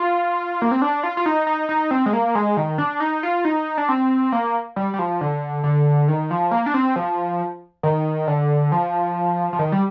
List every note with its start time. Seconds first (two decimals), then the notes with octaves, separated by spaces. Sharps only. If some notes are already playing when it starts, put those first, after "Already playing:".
Already playing: F4
0.62 A#3
0.71 C4
0.82 D4
1.03 F4
1.17 F4
1.26 D#4
1.47 D#4
1.69 D#4
1.91 C4
2.06 G#3
2.13 A#3
2.35 G#3
2.57 D#3
2.78 D4
3.00 D#4
3.23 F4
3.45 D#4
3.78 D4
3.89 C4
4.32 A#3
4.76 G3
4.94 G3
4.99 F3
5.21 D3
5.64 D3
6.08 D#3
6.31 F3
6.51 A#3
6.66 D4
6.74 C4
6.96 F3
7.83 D#3
8.27 D3
8.72 F3
9.53 F3
9.59 D#3
9.72 G3